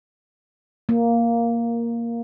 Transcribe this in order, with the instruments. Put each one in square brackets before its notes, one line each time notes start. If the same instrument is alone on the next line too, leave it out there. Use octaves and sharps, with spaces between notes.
[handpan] A#3